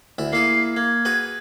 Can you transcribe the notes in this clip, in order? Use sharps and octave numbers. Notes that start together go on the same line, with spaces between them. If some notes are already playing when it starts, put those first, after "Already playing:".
D2 E4
A#3 E4 G#4 C7
A#3 G#6
F#4 G#4 B4